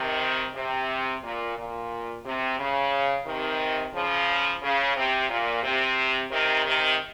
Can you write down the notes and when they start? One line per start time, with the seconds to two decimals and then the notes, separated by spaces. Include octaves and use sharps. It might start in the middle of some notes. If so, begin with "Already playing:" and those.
Already playing: C3 D#3
0.55 C3
1.23 A#2
1.57 A#2
2.25 C3
2.59 C#3
3.26 C3 D#3
3.94 C#3 F3
4.62 C#3
4.96 C3
5.30 A#2
5.63 C3
6.31 C3 D#3
6.66 C3 D#3